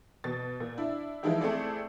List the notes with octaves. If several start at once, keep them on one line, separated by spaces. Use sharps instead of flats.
B2 A6
A#2
D4 E4
E3 F3 G#3 D#4 E4 G4
A3 C4 E4 G#4 A4 D5